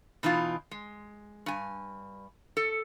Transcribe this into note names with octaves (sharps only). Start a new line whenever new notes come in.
B2 E3 D#4 F4
G#3
G2 G#5
A4